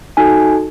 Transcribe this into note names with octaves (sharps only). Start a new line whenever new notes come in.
D#4 F#4 A4 G#5